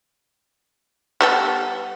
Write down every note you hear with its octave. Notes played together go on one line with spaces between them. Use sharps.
G3 B3 A4